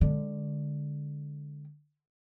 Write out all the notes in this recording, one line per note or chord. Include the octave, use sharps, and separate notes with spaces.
D3 G#3